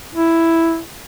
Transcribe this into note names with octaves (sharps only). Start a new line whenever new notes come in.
E4